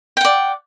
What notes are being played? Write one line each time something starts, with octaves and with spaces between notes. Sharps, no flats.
D5 F#5 G5